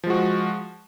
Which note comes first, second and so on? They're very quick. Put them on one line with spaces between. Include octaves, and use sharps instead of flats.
F3 G#3 F#4